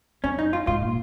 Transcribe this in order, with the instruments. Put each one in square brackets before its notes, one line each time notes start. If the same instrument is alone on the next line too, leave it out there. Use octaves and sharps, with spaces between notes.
[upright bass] F#2 [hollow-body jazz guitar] C#4
[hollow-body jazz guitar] D#4
F4
[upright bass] G#2 [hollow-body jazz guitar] F4
[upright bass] A#2